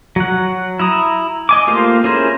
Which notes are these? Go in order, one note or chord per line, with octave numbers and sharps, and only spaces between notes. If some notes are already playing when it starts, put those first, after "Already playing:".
F#3 F#5
E4 A#5 D#6
D#5 G#5 D6
A3 A#3 F4 G4 C5
C#4 E4 G#4 A#4 C5